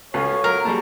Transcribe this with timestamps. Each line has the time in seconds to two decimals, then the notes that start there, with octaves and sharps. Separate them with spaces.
0.14 C#2 F#4 A4 C#5 F5
0.44 F#3 A#4
0.65 G3 A#3 F#4 G#4 A5